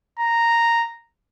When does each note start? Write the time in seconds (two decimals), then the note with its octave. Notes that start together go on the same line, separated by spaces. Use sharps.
0.19 A#5